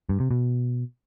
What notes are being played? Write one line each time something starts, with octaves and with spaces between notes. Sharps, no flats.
G2
C3
B2